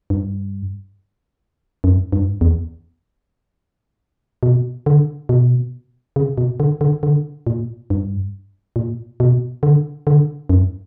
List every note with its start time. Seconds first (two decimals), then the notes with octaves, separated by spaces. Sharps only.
0.10 G2
1.84 F#2
2.12 G2
2.41 E2
4.43 B2
4.86 D3
5.29 B2
6.16 C#3
6.38 B2
6.60 D3
6.81 D3
7.03 D3
7.47 A#2
7.90 G2
8.76 A#2
9.20 B2
9.63 D3
10.07 D3
10.49 F#2